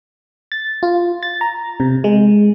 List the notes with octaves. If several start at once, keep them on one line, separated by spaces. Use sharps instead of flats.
A6
F4
A6
A#5
C3
G#3